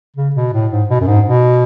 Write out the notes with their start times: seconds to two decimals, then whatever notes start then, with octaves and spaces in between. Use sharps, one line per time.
0.16 C#3
0.35 B2
0.53 A2
0.71 G#2
0.89 B2
1.01 F#2
1.07 G#2
1.25 B2